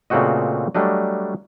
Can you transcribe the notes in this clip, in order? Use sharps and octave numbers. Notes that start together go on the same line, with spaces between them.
A#2 C#3 A3 C4 F#4 D#5
F#3 G3 A3 D4 D#5